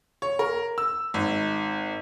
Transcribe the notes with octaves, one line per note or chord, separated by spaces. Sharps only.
C#5
A#4
E6
G#1